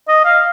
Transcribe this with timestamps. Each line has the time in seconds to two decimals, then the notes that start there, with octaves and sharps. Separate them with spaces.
0.08 D#5
0.25 F5